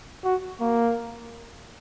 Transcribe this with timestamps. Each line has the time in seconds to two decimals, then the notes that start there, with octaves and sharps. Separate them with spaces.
0.24 F#4
0.61 A#3